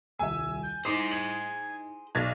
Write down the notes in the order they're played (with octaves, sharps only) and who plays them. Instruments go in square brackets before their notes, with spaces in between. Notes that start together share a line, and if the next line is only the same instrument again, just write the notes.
[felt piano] D#1 C2 E5 [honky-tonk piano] G#5 [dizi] E6
[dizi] G6
[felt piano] D#4 E4 D#6 [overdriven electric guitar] G#4 C5 [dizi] D6 [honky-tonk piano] C7
[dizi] G#6 [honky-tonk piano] F#7
[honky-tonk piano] B1 [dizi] D5 [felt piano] G#6 A6